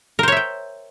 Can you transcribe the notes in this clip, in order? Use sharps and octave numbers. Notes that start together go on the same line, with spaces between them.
A#4 C5 C#5 E5 G5